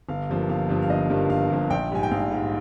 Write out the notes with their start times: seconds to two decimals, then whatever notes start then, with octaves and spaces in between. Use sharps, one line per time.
0.09 G1 F5
0.29 G2 F3 A#3
0.49 G1 F5
0.69 G2 F3 A#3
0.82 F5
0.90 G1 D#5
1.10 G2 F3 A#3
1.30 G1 F5
1.50 G2 F3 A#3
1.70 A#1 G5
1.91 G#2 G3 G#5
2.03 G5
2.11 A#1 F5
2.31 G#2 G3